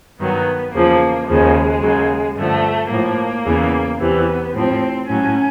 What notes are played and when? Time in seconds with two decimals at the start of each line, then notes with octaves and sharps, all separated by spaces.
0.19 G2 D#3 F#3 B3
0.73 E2 C#3 F3 A#3
1.27 D#2 C#3 F3 G#3
1.82 D#2 C#3 F#3
2.36 G2 D3 F3 A3
2.90 A2 F3 A#3
3.45 E2 C#3 E3
3.99 E2 C3 E3 B3
4.54 A2 F3 C4
5.08 A2 F#3 C#4